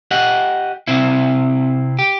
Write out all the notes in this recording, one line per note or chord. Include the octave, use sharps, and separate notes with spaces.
G4 D#5 F#5
C3 C4 E4
G4